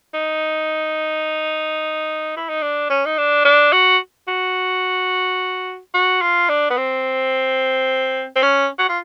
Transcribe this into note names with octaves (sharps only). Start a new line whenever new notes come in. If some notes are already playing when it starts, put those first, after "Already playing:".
D#4
E4
D#4
D4
C#4
D#4
D4
D4
F#4
F#4
F#4
F4
D4
B3
C4
C4
C#4
F#4
F4